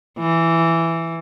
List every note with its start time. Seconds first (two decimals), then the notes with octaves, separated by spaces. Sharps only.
0.18 E3